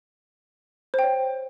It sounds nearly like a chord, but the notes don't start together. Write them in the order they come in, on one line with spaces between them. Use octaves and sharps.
C5 G5 C#5